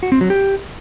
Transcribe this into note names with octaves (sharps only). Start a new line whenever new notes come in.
F#4
C4
F#3
G4